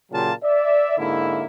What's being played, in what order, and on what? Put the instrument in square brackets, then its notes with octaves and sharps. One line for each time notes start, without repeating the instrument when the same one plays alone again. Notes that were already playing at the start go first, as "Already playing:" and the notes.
[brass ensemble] A#2 C#3 F#3 F4 G4 A5
D5 E5
G#2 D3 A#3 E4